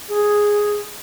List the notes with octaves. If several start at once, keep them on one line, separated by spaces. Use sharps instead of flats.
G#4